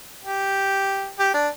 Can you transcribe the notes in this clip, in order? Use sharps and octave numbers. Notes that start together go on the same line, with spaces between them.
G4
G4
D4